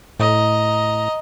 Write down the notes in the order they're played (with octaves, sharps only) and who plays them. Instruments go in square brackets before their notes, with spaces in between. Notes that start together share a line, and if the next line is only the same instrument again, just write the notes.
[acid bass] A2 [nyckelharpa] D#5 A#5